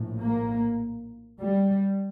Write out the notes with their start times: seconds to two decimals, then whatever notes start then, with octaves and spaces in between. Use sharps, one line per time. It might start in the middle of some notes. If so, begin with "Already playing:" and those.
Already playing: A#1 A2
0.23 A#3
1.40 G3